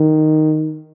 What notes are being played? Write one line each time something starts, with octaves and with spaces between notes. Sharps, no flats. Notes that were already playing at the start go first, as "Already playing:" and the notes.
Already playing: D#3